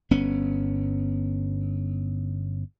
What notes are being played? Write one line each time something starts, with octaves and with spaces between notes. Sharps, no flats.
G1 B3 C#4